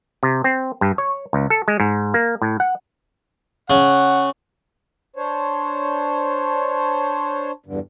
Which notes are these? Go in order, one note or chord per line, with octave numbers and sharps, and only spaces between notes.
C3
C4
G2
C#5
C#2
A4
G#3
G#2
A#3
A2
F#5
C#3 F#5
D4 C5 C#5
E2 G2 D3